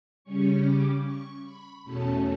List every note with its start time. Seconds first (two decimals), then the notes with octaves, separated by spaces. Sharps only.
0.24 C#3 G3 C#4 C#6
0.64 D6
1.05 C#6
1.44 B5
1.84 E2 B2 A3 C#4 A5